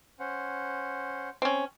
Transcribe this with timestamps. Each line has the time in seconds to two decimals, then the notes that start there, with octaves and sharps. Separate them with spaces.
0.20 C#4 C5 F#5
1.42 C4 C#4